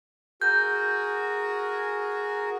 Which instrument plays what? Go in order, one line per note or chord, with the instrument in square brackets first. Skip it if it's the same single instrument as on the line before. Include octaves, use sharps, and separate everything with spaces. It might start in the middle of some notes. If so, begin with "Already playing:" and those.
[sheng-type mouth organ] F#4 G#4 A#4 [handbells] G6